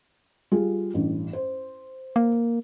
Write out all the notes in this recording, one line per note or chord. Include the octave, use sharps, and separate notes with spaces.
G3 F4 G#4
A1 G2
C5
A#3